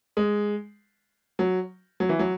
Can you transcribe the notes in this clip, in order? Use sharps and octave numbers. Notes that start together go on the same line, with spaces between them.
G#3
F#3
F#3
E3
F#3